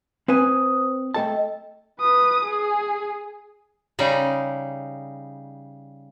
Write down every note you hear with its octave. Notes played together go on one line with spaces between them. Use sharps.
C4 B4 C5 G#5 D#6
A3 A4 D#5 G5 A5
B4 D#6
G#4
C#3 G3 D#4